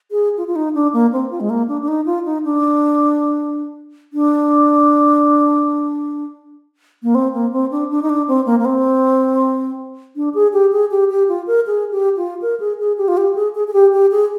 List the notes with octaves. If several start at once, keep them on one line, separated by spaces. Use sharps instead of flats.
G#4
F4
F4
D#4
D4
A#3
C4
F4
G#3
A#3
D4
D4
D#4
F4
D#4
D4
D4
A#3
C4
A#3
C4
D4
D4
D#4
D4
C4
A#3
A#3
C4
D4
G#4
G4
G#4
G4
G4
F4
A#4
G#4
G4
F4
A#4
G#4
G#4
G4
F4
G4
G#4
G#4
G#4
G4
G4
G#4